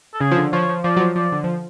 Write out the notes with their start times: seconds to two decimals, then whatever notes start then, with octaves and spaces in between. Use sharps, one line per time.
0.14 A4
0.20 C#3 G#4
0.31 F3
0.37 D3
0.52 F3 C#5
0.69 F3
0.84 F3 D5
0.97 F#3
1.00 F3
1.16 F3 D5
1.32 D3
1.44 F3